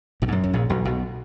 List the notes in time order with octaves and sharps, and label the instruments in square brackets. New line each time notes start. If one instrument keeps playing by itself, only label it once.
[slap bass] B1 B2
G#2
F#2
F#2
A#1 A#2
B1 B2
B1 B2